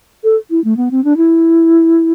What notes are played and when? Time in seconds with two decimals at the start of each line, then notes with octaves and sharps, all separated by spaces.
0.24 A4
0.50 E4
0.64 A3
0.77 B3
0.91 C4
1.04 D4
1.17 E4